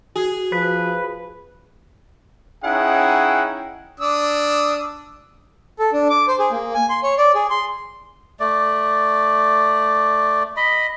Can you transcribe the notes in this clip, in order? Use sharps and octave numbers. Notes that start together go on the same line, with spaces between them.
F#4 G#4
F3 B4
C#4 D#4 E4 G#4 F#5 G5
D4 D#6 E6
A4
D4
D6
C5
G#4
A#3
G#5
C6
C#5
D5
G#4
C6
A3 D5
D#5 B5